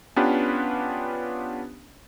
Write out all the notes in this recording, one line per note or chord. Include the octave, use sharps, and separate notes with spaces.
B3 C#4 D4 F4 G4 B4